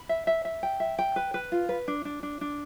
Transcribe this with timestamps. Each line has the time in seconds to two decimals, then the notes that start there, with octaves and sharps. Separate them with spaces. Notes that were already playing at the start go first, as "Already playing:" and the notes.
Already playing: B5
0.09 E5
0.27 E5
0.45 E5
0.63 G5
0.80 E5
0.99 G5
1.16 B4
1.34 B4
1.52 F4
1.69 B4
1.88 D4
2.05 D4
2.23 D4
2.41 D4